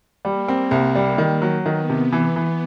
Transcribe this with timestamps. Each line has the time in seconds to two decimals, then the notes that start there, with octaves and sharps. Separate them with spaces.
0.24 G3 A#3
0.48 C4
0.71 C2
0.95 G3
1.18 D#3
1.42 F#3
1.65 D#3 B3
1.89 C3
2.12 E3
2.36 E3